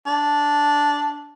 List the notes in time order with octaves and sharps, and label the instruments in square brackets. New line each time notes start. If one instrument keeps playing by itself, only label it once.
[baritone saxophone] D4